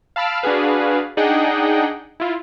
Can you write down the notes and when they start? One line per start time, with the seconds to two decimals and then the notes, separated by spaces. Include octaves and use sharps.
0.16 F5 A5 B5 E6 F6 D7
0.42 D4 F#4 G#4 B4 F5
1.17 D4 D#4 G#4 D#5 F#5 G5
2.20 E4 F4